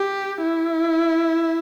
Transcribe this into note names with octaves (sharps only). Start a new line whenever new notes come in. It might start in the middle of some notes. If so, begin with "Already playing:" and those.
Already playing: G4
E4